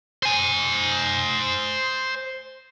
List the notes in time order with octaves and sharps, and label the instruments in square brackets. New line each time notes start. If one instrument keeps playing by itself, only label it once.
[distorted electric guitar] C5 G#5